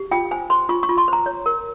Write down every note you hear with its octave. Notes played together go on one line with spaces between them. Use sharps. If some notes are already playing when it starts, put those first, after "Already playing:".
Already playing: G4
F4 G5
C5 G#5
C5 C6
F4 C#6
C#6
F4
C6
C5 A#5
C#5
A#4